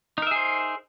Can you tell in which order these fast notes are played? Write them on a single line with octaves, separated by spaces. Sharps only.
D#4 A#4 E5 G#4 C5